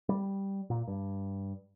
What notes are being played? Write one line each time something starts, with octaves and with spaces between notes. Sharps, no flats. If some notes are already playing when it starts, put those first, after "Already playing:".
G3
A#2
G2